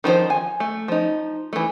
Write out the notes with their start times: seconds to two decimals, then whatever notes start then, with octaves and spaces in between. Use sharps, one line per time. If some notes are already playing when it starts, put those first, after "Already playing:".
0.04 D#3 F3 G#3 D#4 C5
0.30 G#5
0.60 A3
0.88 F3 D#4
1.53 E3 A3